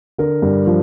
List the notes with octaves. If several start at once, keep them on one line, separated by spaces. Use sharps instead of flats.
D3 A#4
G2
F3